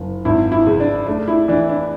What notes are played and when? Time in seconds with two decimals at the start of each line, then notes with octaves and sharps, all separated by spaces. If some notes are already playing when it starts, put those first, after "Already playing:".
Already playing: F#1
0.25 G#1 E4
0.52 E4
0.67 C#3
0.80 D4
1.07 A3 D4
1.28 E4
1.48 E3 D4
1.69 D4